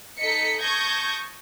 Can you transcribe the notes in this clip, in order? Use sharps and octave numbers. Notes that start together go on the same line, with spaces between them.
D#4 A4 D#5 B6 C#7
A5 C#6 D#6 G6 G#6 A#6